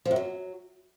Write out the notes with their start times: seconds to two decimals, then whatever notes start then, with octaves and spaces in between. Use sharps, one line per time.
0.05 F3
0.11 F#2
0.16 F#3